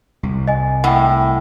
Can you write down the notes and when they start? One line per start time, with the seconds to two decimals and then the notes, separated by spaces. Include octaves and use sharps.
0.23 C2
0.48 D#5 G#5
0.84 A2 F#5 G5